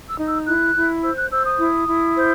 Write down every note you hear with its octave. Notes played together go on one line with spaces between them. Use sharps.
E6
D#4
E6
E4 F#6
E4
C5 E6
F#6
C5 E6
D#6
E4
E4
C5